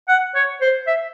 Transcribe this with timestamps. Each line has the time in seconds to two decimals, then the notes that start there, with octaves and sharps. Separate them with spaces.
0.08 F#5
0.35 C#5
0.61 C5
0.87 E5